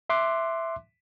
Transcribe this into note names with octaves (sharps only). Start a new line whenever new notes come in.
E5 C6 D6 F#6